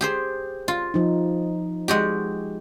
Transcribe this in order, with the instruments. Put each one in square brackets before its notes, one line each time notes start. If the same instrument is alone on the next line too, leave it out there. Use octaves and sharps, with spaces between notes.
[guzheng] G4 G#4 C5
F4
[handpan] F3 D#4
[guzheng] G#3 F#4 G4